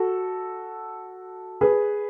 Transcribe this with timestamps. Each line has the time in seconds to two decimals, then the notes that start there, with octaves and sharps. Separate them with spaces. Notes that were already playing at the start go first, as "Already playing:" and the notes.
Already playing: F#4 A4
1.61 G#4 B4